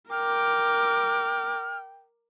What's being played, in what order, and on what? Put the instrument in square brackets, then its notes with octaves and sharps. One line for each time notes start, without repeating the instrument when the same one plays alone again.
[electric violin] A#4 D6 [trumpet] G5 [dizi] F6